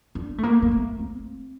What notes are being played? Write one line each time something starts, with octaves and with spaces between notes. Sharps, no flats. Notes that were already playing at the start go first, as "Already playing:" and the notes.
D4
A3
A#3
A#3
A3
C4